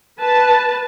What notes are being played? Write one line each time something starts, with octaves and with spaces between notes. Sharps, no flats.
B4 A5